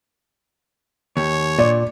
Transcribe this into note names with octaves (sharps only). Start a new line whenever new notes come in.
D#2 C#5
A#2 D5